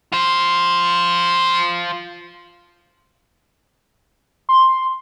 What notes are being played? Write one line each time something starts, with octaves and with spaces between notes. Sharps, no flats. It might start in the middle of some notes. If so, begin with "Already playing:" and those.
F4 C5
C6